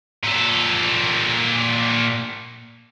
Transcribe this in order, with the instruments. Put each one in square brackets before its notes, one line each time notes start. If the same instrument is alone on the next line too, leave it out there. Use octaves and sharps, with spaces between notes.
[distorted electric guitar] A#2 A4